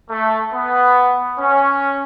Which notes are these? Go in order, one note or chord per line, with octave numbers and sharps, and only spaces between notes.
A3
B3
C#4